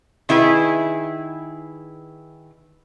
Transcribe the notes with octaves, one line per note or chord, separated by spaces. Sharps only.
D#3 E4 G#4 B4